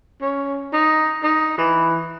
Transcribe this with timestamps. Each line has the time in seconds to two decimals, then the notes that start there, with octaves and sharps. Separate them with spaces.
0.21 C#4
0.73 D#4
1.23 D#4
1.58 E3